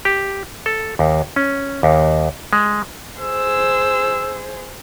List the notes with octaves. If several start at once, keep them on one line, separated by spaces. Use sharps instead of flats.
G4
A4
D#2
C#4
D#2
G#3
G#4 C5 E6